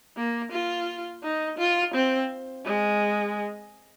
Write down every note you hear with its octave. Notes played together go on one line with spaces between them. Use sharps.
A#3
F4
D#4
F4
C4
G#3